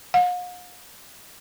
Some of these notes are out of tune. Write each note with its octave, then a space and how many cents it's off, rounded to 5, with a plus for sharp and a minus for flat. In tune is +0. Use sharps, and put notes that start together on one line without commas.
F5 +45